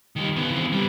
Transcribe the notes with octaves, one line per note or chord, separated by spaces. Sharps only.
D#3 G3
C#3 B3
E3 C4
G3 B3